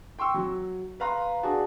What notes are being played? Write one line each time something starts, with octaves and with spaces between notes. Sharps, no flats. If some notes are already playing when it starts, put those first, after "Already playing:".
G5 C6 C#6 E6
F#3
B4 F5 A#5 C6
D4 F#4 G#4 A5